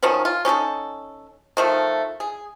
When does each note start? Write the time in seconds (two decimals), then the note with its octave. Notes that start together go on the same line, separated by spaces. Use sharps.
0.03 D#3 F3 F#3 C#4
0.25 F4
0.45 C#4 D#4 G4 A4
1.57 D#3 F3 A3
2.20 G#4